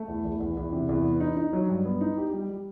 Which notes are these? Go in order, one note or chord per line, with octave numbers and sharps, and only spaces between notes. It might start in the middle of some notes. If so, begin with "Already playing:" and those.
Already playing: A3
E2
E2
E2
E2
C3
E2
B3
D#4
D#4
F#3
G2
B3
D#4
G4
G3
G3